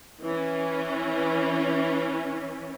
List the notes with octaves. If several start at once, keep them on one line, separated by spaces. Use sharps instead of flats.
E3 C#4